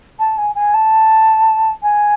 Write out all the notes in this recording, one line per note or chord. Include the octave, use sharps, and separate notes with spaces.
A5
G#5
G#5
A5
G#5